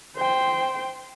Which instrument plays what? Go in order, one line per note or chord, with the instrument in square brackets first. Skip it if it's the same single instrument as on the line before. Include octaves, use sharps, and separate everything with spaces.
[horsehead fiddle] C5 G5